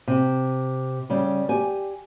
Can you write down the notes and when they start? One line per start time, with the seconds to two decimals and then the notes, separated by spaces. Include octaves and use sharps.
0.08 C3
1.10 C#3 G3
1.49 G4 G#5